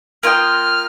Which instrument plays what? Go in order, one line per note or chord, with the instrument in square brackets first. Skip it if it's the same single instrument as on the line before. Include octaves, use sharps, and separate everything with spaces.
[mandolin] A#3 F4 D#5 G5 [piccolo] F6